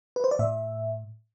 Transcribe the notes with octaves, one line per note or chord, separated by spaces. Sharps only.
B4
C5
D5
A2 E5